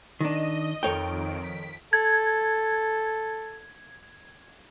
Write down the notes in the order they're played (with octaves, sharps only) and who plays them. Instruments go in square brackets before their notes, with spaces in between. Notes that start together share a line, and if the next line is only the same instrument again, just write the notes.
[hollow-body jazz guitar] D#3 D4 [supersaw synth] D#5
[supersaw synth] F2 D#3 D7 [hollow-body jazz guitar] A4 C#5 G5
[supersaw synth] B6
[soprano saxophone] A4 [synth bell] G#6